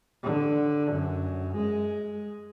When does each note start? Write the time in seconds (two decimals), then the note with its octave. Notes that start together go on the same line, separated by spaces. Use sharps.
0.23 D3
0.92 F#2
1.56 G#3